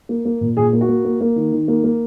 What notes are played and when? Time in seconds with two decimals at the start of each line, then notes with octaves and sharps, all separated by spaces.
0.09 A#3
0.25 A#3
0.41 A#2
0.57 A#2 G#4
0.73 A#3
0.81 F#4
0.89 A#3
1.05 A#3
1.21 A#3
1.36 D#3
1.52 D#3
1.68 A#3
1.84 A#3